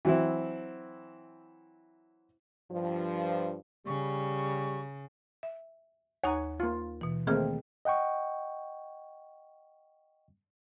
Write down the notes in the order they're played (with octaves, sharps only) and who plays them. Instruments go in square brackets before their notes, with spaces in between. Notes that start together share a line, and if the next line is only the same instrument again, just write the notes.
[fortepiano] E3 F#3 C4 E4
[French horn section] G2 F3
[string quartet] C#3 [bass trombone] G3 [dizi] C#6
[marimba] E5
[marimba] D#2 D#4 A#5 [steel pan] C#5 F#5 G#5
[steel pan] A#3 F4
[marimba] B2 E3
[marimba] D#3 G#4 F6 [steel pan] A3 A#3 C4
[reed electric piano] D#5 F#5 G5 C#6